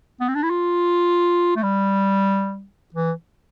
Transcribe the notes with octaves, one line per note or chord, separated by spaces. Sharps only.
B3
C4
D4
E4
F4
A3
G3
E3